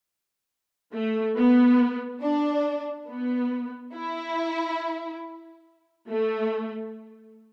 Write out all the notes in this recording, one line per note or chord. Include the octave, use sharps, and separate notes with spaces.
A3
B3
D4
B3
E4
A3